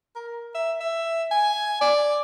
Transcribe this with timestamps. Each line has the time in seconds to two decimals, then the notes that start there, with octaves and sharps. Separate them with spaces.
0.16 A#4
0.55 E5
0.81 E5
1.31 G#5
1.81 D5